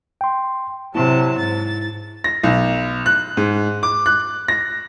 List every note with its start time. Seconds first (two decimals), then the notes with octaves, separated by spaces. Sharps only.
0.21 G5 C6
0.95 C3 F#3 E4 A5
1.40 G#2 A6
2.24 A#6
2.43 B1
3.06 F#6
3.37 G#2
3.83 D6
4.06 F#6
4.48 A#6